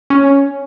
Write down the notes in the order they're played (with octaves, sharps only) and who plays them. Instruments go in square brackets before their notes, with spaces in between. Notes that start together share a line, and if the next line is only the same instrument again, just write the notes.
[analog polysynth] C#4